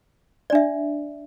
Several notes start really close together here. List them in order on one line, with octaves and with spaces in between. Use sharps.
D5 D4 E5